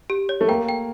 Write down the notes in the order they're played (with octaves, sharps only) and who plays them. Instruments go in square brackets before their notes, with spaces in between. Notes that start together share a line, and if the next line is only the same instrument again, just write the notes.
[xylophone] G4
C#5
[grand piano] A3
[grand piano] A#3 [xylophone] G5
[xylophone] G5